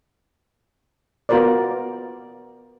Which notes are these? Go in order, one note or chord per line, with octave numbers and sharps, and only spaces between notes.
B3 F4 F#4 A#4 C5 D5